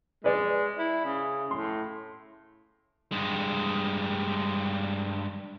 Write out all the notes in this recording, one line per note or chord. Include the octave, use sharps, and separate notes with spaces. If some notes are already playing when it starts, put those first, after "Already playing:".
G#3 B4 D5
E4
C#3
A2 C6
G2 G#3